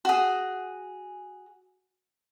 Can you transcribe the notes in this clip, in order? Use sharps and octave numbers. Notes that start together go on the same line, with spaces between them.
F#4 G#4